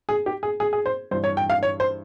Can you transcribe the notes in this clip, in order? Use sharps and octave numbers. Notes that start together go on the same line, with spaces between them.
G#4
G4
G#4
G#4
G#4
C5
G2 E3 C5
C#5
G5
F5
C#5
C5